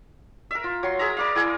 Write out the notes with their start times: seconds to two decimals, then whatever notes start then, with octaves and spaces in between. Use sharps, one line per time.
0.51 A#4 E5
0.64 F4
0.83 F#3 C6
0.99 G#4 A#4 E5 A#5
1.17 A#4 D5 F5
1.35 E4 G#4 F5 G#5